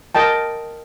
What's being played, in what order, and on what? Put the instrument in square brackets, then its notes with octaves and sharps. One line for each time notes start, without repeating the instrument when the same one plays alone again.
[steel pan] A#4 D#5 G5 A5